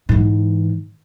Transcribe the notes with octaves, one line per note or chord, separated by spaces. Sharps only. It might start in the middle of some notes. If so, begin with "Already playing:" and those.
G#2 E3